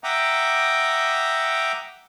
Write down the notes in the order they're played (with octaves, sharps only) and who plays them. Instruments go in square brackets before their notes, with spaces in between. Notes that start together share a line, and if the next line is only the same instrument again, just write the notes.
[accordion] E5 F#5 G5 A#5 D6 D#6